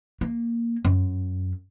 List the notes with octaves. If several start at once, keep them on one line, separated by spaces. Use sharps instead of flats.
A#3
F#2